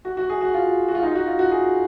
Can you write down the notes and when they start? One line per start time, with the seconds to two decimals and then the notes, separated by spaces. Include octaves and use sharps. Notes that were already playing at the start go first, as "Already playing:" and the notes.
0.05 F#4
0.17 F#4
0.30 G#4
0.41 F#4
0.54 F4
0.88 F#4
0.95 F4
1.03 D#4
1.15 F#4
1.27 F4
1.39 F#4
1.51 G#4